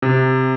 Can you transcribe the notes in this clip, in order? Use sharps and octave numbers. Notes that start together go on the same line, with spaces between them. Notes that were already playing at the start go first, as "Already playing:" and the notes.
C3